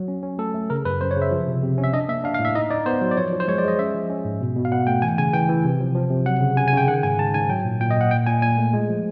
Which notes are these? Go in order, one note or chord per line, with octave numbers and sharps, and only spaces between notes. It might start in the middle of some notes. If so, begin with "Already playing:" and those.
Already playing: F#3
C#4
C#4
A3 A4
A3
C#3 A#4
F#2 B4
F#2 C5
C#5
C#3
E5
F3
C3
C3
C#4
E5
D4 D#5
A#3 E5
D4 F5
F5
A2
E5
D#4 D#5
D#4 D5
B3 C5
F#3
D5
F3 C#5
F3
C5
G#3 C#5
D5
G#3 D#5
C#4 E5
F3
C#4
G#2
B2
B2
F5
B2 F#5
A3 G5
E3 G#5
C#3 G#5
E3 G5
E3
C3
F3
F3
C3
F#3 F#5
C#3
C#3 G#5
G#5
C#3 G5
D#3 F#5
G#2 G#5
G#2 A5
G#2 G#5
F#3 G5
A#2
A#2 G5
D#5
A#2 F#5
A#2 G5
A#2 G#5
A#2 G#5
A3
G#3
F3